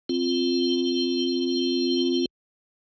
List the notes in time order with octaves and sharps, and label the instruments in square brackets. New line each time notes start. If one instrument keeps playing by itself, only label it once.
[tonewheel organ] C4 F4